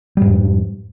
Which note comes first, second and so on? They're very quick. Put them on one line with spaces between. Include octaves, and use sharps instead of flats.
G3 G#2 F2